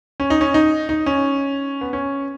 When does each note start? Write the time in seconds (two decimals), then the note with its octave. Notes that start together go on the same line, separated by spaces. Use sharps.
0.20 C#4
0.30 D#4
0.41 C#4
0.54 D#4
0.89 D#4
1.06 C#4
1.81 B3
1.93 C#4